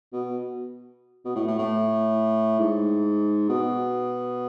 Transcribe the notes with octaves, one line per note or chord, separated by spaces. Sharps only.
B2
B2
A2
A2
A2
G#2
B2